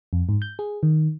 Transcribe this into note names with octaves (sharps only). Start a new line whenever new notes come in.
F2
G#2
G6
G#4
D#3